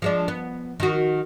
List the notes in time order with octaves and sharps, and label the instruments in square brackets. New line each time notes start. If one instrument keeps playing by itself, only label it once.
[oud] F3 G#3 D4
B3
D#3 F#4